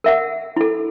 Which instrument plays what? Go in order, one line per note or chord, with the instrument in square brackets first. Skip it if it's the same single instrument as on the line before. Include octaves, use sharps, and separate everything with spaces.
[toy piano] A#4 E5 F#5
E4 A4